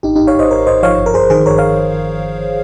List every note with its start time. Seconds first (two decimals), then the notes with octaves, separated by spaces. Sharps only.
0.03 G#1 D#4 G4
0.16 G#1 D#4 G4
0.27 C#5 F5
0.35 G#1 C5 D#5
0.51 G#1 A#4 C#5
0.67 G#1 C5 D#5
0.83 F3 C#5 F5
0.98 G1
1.06 A#4
1.14 G1 G#4 C5
1.30 D#3 G#4 C5
1.46 G1 A#4 C#5
1.57 C#5 F5